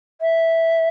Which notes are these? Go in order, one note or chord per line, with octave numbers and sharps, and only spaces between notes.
E5